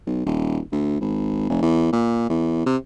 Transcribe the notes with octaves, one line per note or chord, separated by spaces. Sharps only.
B1
D#1
D2
G#1
F1
E2
A#2
E2
C3